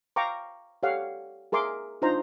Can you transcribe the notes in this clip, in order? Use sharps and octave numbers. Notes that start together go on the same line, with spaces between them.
F5 G5 A#5 C#6 D6
G4 A4 C#5 D5 F5 F#5
G#4 A#4 E5 C6 D6
D4 D#4 F4 C5 A#5